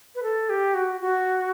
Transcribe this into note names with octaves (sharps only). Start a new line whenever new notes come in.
B4
A4
G4
F#4
F#4